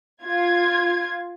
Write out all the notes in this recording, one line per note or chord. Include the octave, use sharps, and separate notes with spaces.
F4 G#6